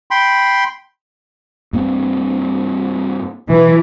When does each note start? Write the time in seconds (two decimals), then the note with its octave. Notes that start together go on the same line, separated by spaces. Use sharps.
0.11 G5 B5 C6
1.73 G2 A#3 C4
3.50 B2 E3